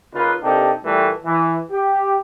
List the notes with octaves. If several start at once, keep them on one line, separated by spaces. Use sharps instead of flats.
C#3 A#3 D#4 F4 B4
C3 A#3 D4 D#4 G4 A4
A#2 E3 G3 A3
E3
G4